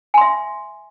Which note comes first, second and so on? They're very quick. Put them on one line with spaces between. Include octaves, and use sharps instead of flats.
G#5 C6 E5